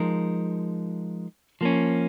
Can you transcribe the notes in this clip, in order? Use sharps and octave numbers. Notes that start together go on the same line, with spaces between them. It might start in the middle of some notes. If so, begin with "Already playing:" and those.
Already playing: F3 G#3 D#4 A#4
F3 A#3 C#4